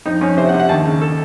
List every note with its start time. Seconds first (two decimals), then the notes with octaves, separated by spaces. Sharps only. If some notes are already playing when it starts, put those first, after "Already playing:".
0.06 F2 D#4
0.21 F2 C#4
0.37 C3 C5
0.49 F#5
0.54 C3
0.60 F#5
0.69 D#2 A5
0.85 C#3
1.01 A4